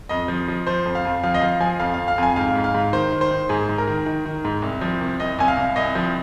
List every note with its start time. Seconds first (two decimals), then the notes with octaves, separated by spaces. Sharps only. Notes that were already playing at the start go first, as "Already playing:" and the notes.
0.09 F2 D#5
0.28 F3
0.48 F3
0.67 F3 C5
0.86 F2
0.95 F5
1.05 F2
1.23 F3 F5
1.34 D#5
1.42 F3 F5
1.60 F3 G#5
1.80 F2 F5
1.94 F2 F5
2.08 F5
2.18 F2 G#5
2.36 G#2 F5
2.55 G#2
2.64 F5
2.74 G#2
2.93 D#3 C5
3.12 D#3
3.21 C5
3.31 D#3
3.49 G#2 G#4
3.69 G#2
3.78 A#4
3.88 D#3
4.06 D#3
4.26 D#3
4.45 G#2
4.62 C2
4.81 F3
5.01 C2
5.20 C2 D#5
5.39 C2 G#5
5.48 F5
5.57 C2
5.76 C2 D#5
5.95 F3